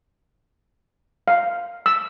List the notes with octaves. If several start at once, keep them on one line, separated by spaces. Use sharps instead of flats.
F5
E6